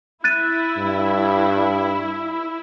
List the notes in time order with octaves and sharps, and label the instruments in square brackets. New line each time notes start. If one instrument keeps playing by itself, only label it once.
[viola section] E4 [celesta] F#6 A6 D#7
[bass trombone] G2